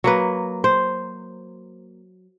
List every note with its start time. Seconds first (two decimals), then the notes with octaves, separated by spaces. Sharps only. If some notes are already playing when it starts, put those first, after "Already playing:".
0.04 F#3 A#3 B4
0.64 C5